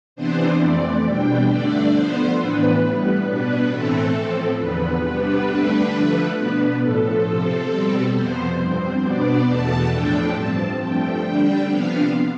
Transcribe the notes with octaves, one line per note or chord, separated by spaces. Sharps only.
C3 E3 B3 D4 C5
F2 E3 A3 C4 D5
B2 G3 D4 G5
G2 D3 A3 D4 D5
D3 F3 B3 C5
A2 E3 B3 D4 B4
A2 G3 B3
B2 B3 D4 B4
A2 E3 A3 C4 A4
A2 F3 C4
E2 D3 F3 B3 B4
C3 G3 B3 D4 B4
G2 D3 A3 D4
D3 F3 A3
B2 B3 D4 B4
A2 F3 A3 A4
C3 F3 C4
B2 G3 C4
F2 C3 F3 B3 C5
G2 F3 C4 C5
B2 B3 D4 D5
E2 B2 A3 A5
A2 F3 A3 D4 G5
G2 F3 C4 A5
G2 F3 A3 G5
D3 G3 D4
C3 F3 B3 D4 F5